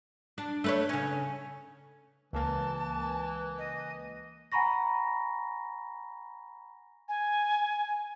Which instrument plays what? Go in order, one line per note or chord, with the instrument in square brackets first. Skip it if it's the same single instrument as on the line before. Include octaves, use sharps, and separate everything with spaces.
[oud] D4
A3 B4 C#5
C#3 C#4
[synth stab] C#2 A#3 [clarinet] E3 [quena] A5
[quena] D#5
[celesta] F#5 G#5 A#5 B5 C#6 A#6
[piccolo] G#5